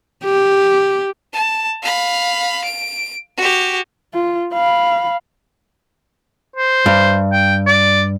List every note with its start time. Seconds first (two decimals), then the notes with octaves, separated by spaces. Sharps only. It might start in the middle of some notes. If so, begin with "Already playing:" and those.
0.24 G4
1.33 A5
1.82 F5 B5
2.64 D7
3.37 F#4 G4
4.13 F4
4.54 F5 B5
6.56 C5
6.86 G2
7.33 G5
7.67 D5